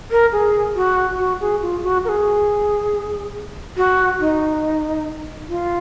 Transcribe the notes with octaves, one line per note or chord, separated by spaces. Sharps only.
A#4
G#4
F#4
F#4
G#4
F4
F#4
A#4
G#4
F#4
D#4
F4